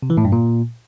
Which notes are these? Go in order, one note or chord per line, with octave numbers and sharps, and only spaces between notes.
C3
E3
A2
G2
A#2